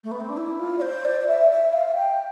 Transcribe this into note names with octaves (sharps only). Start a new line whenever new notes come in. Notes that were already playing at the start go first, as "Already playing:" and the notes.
A3
B3
C4
D4
E4
F4
D5
C5
D5
D5
E5
E5
F5
G5